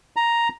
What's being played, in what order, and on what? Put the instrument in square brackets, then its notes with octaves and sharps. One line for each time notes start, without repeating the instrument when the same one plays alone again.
[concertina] A#5